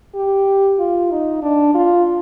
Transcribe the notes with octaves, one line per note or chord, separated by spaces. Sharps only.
G4
F4
D#4
D4
F4